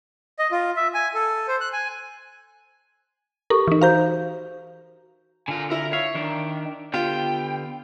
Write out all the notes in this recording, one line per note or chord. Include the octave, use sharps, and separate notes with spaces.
D#5
F4
E5
G#5
A4
C5
F#6
G#5
G4 A4 A#4 C#6
E3 D#4
F#4 C5 F5 A#5 G6
D3 F4 A#4 G#5
E4 A#4
C#5 E5 F5
D#3 D4
D3 B3 F4 G4 G5